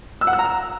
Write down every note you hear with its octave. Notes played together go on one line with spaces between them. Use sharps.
E6
F#5
E6
A#5
E6